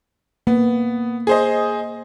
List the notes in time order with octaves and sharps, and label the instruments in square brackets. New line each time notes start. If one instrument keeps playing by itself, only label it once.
[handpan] A#3 [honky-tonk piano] B3
[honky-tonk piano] G#4 C5 D#5